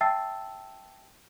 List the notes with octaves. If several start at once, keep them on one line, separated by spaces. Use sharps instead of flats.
E5 G5 A5 E6 A6 C7